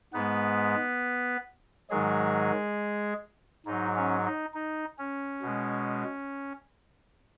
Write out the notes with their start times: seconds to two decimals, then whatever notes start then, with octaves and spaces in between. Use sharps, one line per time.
0.14 G#2 G#3 B3 B4
1.90 G#2 D#3 F#3 G#3 G#4
3.66 G#2 F#3 D#4
3.96 C#4
4.25 D#4
4.54 D#4
4.98 C#4
5.42 B2 G#3